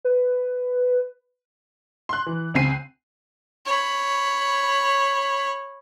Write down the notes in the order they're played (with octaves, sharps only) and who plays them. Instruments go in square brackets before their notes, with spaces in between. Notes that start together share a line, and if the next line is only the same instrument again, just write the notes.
[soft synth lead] B4
[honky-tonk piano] C6 F#6
E3
C#2 C#3 C4 G#5 C7 D#7
[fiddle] C#5 B5